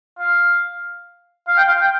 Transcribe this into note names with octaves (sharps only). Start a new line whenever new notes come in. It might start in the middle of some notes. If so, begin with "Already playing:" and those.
F5
F5
G5
F5
G5